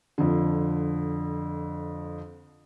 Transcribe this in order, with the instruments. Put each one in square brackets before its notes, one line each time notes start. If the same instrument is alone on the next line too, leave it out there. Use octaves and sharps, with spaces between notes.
[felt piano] F2 D3